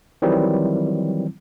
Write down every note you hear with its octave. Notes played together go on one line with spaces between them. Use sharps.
D#3 E3 F#3 G3 C4 E4